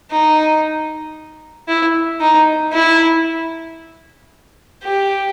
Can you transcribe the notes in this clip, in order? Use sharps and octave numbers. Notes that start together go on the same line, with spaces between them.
D#4
E4
D#4
E4
G4